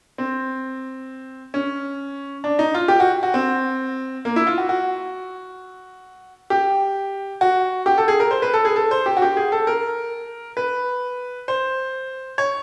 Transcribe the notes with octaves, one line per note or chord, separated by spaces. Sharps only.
C4
C#4
D4
D#4
F4
G4
F#4
F#4
C4
A#3
E4
F4
F#4
F#4
G4
F#4
G4
A4
G#4
A#4
C5
B4
A4
G#4
A4
C5
G4
F#4
G4
G#4
A4
A#4
B4
C5
C#5